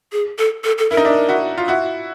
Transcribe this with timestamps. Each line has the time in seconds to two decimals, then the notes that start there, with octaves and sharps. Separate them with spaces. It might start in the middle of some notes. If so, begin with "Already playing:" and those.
0.12 G#4
0.39 A4
0.64 A4
0.78 A4
0.90 E4 A#4
0.97 D#4
1.05 D4 E4
1.29 E4 F#4
1.58 F4
1.68 E4 F#4